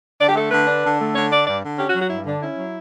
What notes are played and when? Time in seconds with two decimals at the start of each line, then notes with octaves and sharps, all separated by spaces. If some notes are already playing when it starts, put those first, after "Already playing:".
0.19 D3 D5
0.29 G4
0.35 A3 A4
0.51 D3 B4
0.67 D4
0.84 D3
0.98 A3
1.15 D3 C#5
1.31 D4 D5
1.46 G2 D5
1.63 D3
1.78 C#4 G4
1.89 F#4
1.95 F#3
2.00 F#4
2.10 G2 E4
2.26 D3 D4
2.42 C#4 E4
2.58 F#3